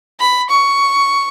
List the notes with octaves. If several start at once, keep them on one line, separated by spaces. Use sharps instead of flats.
B5
C#6